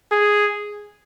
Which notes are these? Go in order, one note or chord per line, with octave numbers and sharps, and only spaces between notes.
G#4